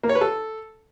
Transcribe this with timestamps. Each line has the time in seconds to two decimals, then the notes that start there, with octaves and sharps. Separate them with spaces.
0.03 A#3
0.09 C#5
0.15 B4
0.21 A4